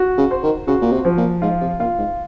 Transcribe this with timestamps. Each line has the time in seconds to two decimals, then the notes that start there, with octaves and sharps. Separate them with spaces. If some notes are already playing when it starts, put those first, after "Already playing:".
Already playing: F#4
0.18 C#3
0.31 C5
0.43 D#3
0.68 C#3 F#4
0.81 A#2
0.92 C3
1.05 F3
1.17 A#2
1.42 G#2 F4
1.61 C3
1.79 A#2 F4
1.98 G#2